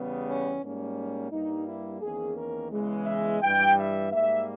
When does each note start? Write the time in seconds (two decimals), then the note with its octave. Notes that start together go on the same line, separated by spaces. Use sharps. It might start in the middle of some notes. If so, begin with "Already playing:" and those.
Already playing: E2 C#3 G3 B3
0.26 C#4
0.62 G#2 G3 A#3 C#4
1.31 G2 G3 A#3 D#4
1.66 E4
2.01 E2 D#3 A#3 C#4 G#4
2.36 A#4
2.72 E2 C#3 E3 G#3
3.06 E5
3.41 G2 E3 G3 G5
3.77 E5
4.12 G#2 G3 A#3 E5